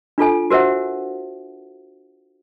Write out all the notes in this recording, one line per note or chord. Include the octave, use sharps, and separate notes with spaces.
D4 F4 A4 G#5
F#4 A#4 C5 E5 F#5